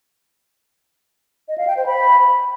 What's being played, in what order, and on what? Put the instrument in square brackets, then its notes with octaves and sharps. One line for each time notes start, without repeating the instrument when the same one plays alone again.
[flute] D#5
F5
G5
C5
B5